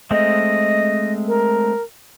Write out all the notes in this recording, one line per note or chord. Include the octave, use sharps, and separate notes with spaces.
G#3 A3 C4 D#5
A#4